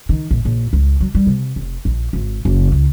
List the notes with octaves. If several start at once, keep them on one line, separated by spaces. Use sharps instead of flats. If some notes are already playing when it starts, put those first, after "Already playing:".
D#3
A#1
A#1
C#2
F#3
G3
C3
F1
A#1
G#1
F#1
C#2